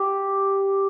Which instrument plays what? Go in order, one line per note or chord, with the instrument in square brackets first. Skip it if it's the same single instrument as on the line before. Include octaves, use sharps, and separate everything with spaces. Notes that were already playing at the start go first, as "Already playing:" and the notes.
Already playing: [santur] G4